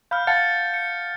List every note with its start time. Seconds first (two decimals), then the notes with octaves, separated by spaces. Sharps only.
0.11 F5 B5 F6 G6
0.27 F5 F#5 A5 A6 C#7
0.74 C#7